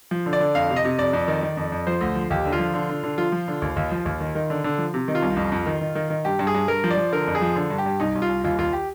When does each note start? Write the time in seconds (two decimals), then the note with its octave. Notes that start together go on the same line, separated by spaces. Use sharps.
0.11 F3
0.26 D3
0.33 D5
0.40 D3
0.55 F2 F5
0.70 C3
0.76 D#5
0.84 C3
0.99 F2 D5
1.13 F2
1.28 D#3
1.43 D#3
1.57 F2
1.72 F2
1.87 F3 C5
2.01 D2
2.15 F3
2.30 D#2 G4
2.45 D3
2.52 F4
2.59 F3
2.74 D3
2.89 D3
3.03 D3
3.18 F3 F4
3.32 F3
3.48 D3
3.62 D#2
3.76 D#2
3.91 F3
4.06 D#2
4.20 D#3
4.35 D#3
4.50 D3
4.64 D3
4.78 F3
4.94 C3
5.08 D#3
5.15 F4
5.22 C2
5.37 F2
5.52 F2
5.66 D#3
5.81 D#3
5.95 D#3
6.10 D#3
6.25 G2 G4
6.39 G2
6.47 G#4
6.55 G2
6.68 G2 A#4
6.84 F3
6.91 D5
6.97 F3
7.12 D3 A#4
7.27 F2
7.35 G#4
7.42 F3
7.56 D3
7.70 G2
7.78 G4
7.86 G2
8.00 C2 D#4
8.15 C2
8.22 F4
8.29 C2
8.44 D#2 F4
8.58 D#2 F4
8.73 G4